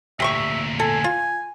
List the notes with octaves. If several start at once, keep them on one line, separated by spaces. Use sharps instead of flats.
D2 A#2 G4 E5 C6 C#6
A4 G#5
F4